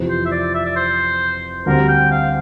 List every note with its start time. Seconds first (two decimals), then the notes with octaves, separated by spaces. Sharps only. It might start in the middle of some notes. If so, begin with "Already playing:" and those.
Already playing: F2 C3 E3
0.09 C5
0.26 E5
0.31 D5
0.54 E5
0.66 D5
0.76 C5
1.66 D2 D3 G3 C4 A#4
1.88 G5
2.11 F5